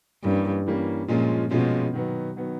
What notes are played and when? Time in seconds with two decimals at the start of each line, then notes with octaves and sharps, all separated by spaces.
0.24 G2 E3 G3 A#3 C#4
0.66 E3 G3 A#3 C#4
1.08 A#2 F3 G#3 C#4 F4
1.51 B2 F3 G#3 C#4 F4
1.94 D#3 F#3 B3
2.36 D#3 F#3 B3